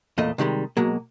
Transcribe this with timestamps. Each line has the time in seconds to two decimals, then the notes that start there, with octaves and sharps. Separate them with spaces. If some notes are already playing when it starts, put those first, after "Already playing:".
0.18 E2 A#2 A3 D#5
0.38 C3 D#3 G3 G#3
0.77 B2 F#3 G#3 A#3